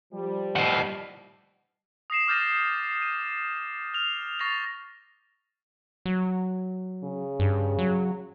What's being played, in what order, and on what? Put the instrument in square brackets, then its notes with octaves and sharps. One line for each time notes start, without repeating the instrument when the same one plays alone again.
[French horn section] F3 G3
[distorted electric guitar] A2 D#3 [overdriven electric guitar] D#5 F#5
[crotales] D#6 A#6 C7 E7
D6 F6 G6 A6 A#6 D#7
D#7
F6 F7
C#6 A6 A#6 C7 F7
[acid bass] F#3
[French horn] C#3
[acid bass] G2
F#3